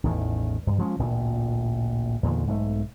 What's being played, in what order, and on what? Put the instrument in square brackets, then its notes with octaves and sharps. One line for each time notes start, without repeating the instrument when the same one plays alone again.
[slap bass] A1 E2 A2 D#3
G2
F3 G#3 C#4
A1 D2 A#2
E2 A#2 D3 D#3
B1 G#2 E3 A3